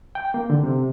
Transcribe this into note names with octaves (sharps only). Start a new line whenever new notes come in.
G5
A#3
D3
C3